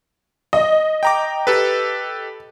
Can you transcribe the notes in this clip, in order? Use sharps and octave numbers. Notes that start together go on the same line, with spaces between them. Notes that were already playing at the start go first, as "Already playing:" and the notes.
D#5
G5 A#5 D6
G4 A4 B4